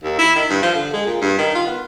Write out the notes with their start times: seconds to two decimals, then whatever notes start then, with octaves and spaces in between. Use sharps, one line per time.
0.04 D#2
0.19 E4
0.35 D#3
0.50 G2
0.62 F3
0.74 D3
0.93 G#3
1.06 A#2
1.22 G2
1.38 D#3
1.55 F4
1.66 B3